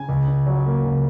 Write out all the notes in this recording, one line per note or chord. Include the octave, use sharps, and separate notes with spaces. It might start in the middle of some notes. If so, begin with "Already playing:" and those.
Already playing: C#3 G#5
C#2
C#3
F#3
A#3
C#2